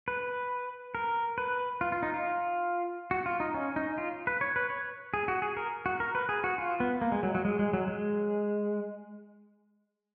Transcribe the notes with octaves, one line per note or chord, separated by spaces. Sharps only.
B4
A#4
B4
F4
F4
D#4
F4
F#4
F4
D#4
C#4
D#4
F4
B4
C#5
B4
C#5
G#4
F#4
G#4
A#4
F#4
A#4
B4
G#4
F#4
F4
B3
A#3
G#3
F#3
F#3
G#3
G#3
F#3
G#3